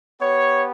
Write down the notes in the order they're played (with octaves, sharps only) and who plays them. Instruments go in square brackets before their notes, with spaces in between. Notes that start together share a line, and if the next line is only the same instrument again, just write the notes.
[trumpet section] B3 G4 C#5